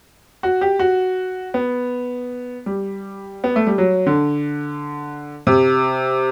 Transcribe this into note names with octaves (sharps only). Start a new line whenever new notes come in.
F#4
G4
F#4
B3
G3
B3
A3
G3
F#3
D3
C3